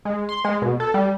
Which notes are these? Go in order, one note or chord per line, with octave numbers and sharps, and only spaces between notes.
G#3
C6
G#3
B2
A4
G3